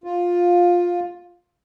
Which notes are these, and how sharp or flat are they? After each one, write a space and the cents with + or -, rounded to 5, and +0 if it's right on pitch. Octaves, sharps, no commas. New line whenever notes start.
F4 +10